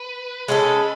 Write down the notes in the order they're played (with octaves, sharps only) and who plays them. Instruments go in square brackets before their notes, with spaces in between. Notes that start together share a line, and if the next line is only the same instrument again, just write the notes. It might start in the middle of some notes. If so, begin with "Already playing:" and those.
Already playing: [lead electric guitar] B4
[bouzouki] G#3 C#4 F#4 A4